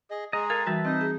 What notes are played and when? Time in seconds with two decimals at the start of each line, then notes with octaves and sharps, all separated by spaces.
0.10 G#4 D#5
0.33 G#3 G#4 D#5 A#5
0.50 A4 A#4 F5 G#5
0.66 E3 G3 F#4 B4 E5 A5
0.85 C4 D#4 D#5
1.01 G#4